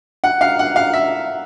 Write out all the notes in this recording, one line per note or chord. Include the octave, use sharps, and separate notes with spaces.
F#5
F5
F#5
F5
E5